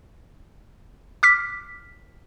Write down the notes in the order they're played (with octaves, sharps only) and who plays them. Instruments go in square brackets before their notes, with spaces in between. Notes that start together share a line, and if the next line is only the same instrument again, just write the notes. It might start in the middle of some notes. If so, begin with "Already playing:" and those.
[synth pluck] D6 F6 B6